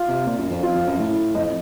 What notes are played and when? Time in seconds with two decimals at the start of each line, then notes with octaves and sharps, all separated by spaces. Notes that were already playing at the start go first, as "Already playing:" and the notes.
Already playing: F4
0.08 C3
0.26 A#2
0.39 F#2
0.50 F2
0.63 F4
0.75 F2
0.87 F#2
0.99 A2
1.35 F2 D#5